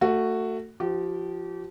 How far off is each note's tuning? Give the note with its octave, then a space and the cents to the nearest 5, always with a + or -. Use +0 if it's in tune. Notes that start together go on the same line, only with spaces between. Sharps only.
A3 +25 F#4 +0
F3 +0 G4 -35